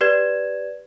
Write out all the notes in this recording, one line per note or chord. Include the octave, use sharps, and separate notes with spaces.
G4 B4 D5 G#6 E7